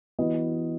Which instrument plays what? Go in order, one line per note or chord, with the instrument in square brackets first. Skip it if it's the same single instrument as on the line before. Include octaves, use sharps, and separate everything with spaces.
[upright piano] E3 B3 F#4 B4 D#5